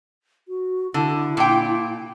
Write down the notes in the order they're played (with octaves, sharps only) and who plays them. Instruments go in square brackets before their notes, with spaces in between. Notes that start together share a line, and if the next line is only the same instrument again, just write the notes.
[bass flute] F#4
[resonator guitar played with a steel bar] D3 [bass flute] E4
[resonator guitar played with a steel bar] A#2 G5